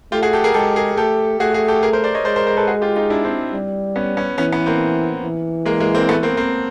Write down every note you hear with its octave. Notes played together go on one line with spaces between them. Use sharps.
A3 F4 G4
F#4 G#4
G4 A4
G#4 A#4
G#3 G4 A4
G#4 A#4
A3 G4 A4
A3 F#4 G#4
F#4 G#4
G4 A4
G#4 A#4
A#4 C5
C5 D5
C#5 D#5
G#3 C5 D5
A#4 C5
A#4 C5
A4 B4
F#4 G#4
F4 G4
D#4 F4
D4 E4
C4 D4
G3
B3 C#4
B3 C#4
E3 B3 C#4
B3 C#4
A#3 C4
E3
G#3 A#3
G#3 A#3
A#3 C4
A3 B3
A#3 C4
A#3 C4